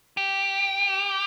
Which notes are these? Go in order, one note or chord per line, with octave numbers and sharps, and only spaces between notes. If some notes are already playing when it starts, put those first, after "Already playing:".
G4